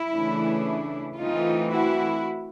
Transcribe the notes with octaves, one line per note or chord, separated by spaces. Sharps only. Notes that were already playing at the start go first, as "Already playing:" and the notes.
Already playing: E4
C#3 E3 A3 D4
E3 A3 C4 D#4 F4
E4 F#4